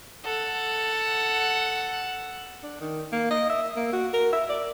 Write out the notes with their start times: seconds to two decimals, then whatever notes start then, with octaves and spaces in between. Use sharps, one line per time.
0.24 A4 F#5
2.63 D4
2.80 D#3
3.12 A#3
3.31 D#5
3.50 E5
3.77 A#3
3.93 F#4
4.14 A#4
4.33 E5
4.49 D5